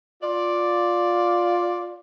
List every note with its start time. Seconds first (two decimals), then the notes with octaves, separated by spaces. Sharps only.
0.23 F4 D5